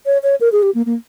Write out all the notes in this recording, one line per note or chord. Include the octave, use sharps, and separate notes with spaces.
C#5
C#5
A#4
G#4
G4
A#3
A#3